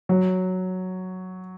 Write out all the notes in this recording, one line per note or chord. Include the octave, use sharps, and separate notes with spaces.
F#3